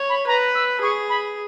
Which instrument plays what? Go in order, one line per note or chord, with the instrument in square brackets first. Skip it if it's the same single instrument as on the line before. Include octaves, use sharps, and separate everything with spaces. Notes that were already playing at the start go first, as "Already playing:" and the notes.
Already playing: [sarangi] C#5
[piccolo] B5
[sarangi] B4 [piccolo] A#5
[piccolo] E6
[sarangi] G#4 [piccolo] C#6
[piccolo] B5